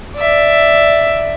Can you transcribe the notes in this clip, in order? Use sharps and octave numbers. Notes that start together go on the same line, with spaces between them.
D5 E5